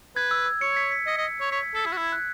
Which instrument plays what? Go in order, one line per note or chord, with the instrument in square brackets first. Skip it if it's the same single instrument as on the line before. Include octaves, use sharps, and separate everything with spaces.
[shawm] B4 [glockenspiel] G#6
[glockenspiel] E6
E6
[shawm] C#5 [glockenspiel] C#7
[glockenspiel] B6
B6
[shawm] D#5 [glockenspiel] C#7
[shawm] D#5
C#5
[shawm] C#5 [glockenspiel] B6
[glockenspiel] G#6
[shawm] A4 [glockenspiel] B6
[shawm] E4 [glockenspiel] G#6
[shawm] F#4
[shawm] E4 [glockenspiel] G#6
[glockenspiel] F#6